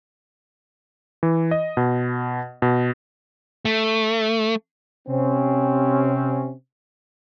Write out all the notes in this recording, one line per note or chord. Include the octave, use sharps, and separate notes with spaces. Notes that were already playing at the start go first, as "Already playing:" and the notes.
E3
D#5
B2
B2
A3
C3 C4 C#4